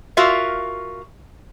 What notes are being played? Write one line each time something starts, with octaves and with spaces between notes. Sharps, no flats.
F4 F#4 A#4 E5 F5